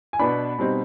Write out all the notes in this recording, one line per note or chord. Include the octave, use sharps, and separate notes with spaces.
G#5
B2 B3 D4 B5
B2 G3 C4 D#4